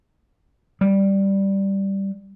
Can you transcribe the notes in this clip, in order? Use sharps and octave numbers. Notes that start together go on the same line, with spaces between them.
G3